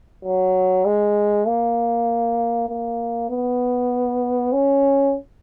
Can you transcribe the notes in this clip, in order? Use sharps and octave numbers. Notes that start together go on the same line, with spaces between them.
F#3
G#3
A#3
A#3
B3
C#4